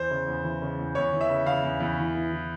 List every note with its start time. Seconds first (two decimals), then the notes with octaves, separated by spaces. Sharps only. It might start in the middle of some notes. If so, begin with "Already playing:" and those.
Already playing: E2 C5
0.10 C#3
0.27 E2
0.44 E3
0.62 C#3
0.79 E2
0.95 E2 C#5
1.13 E3
1.21 E5
1.30 C#3
1.46 C#3 F5
1.63 E2
1.80 E2
1.98 E3
2.15 E3
2.32 E3